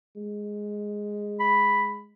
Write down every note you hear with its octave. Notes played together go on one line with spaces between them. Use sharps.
G#3
B5